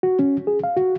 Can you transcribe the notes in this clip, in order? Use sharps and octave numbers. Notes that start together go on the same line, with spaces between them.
F#4
C#4
G#4
F5
F#4